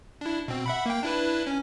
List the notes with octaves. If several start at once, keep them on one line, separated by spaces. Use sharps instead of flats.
D4 E4
B2 C4
E5 F#5 B5
A#3 G5
D4 E4 B4
C#4